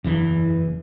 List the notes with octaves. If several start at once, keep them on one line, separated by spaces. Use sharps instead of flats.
F#1 E2 E3